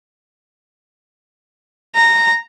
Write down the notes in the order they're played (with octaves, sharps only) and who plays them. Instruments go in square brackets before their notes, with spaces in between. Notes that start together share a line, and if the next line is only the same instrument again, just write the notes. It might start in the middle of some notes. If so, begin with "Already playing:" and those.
[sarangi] A#5